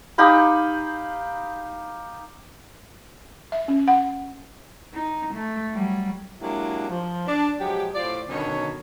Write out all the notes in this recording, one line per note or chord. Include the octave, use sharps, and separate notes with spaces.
D#4 G4 F5 B5
E5
C#4
F#5
D#4
A3
F#3 G3
F#3 G#3 A#3 D4 E4 G4
F3
D4
F3 F#3 G#3 G4
A2 F4 C5 D5
B2 D3 D#3 F#3 C#4 C#5